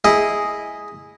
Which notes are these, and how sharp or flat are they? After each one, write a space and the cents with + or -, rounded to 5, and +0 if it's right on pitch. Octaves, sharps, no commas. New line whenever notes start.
E4 -5 G#4 +0 D#5 +0